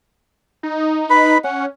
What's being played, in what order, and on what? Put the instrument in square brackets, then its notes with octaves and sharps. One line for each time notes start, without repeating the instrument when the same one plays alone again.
[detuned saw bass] D#4
[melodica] B4 B5
[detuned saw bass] C#4 [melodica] F#5